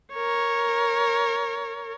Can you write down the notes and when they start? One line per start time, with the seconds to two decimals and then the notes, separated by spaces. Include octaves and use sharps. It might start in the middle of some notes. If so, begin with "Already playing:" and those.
0.14 A#4 C#5